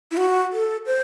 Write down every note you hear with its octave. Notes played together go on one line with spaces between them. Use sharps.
E4
F#4
A4
C5